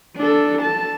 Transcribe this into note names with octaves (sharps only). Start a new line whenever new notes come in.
D4 A4
A5